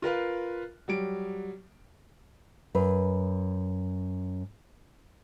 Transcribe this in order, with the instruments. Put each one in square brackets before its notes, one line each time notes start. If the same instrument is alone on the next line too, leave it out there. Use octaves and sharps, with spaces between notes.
[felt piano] F4 A#4 B4 F5
F#3 G3 D7
[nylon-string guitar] F#2 B4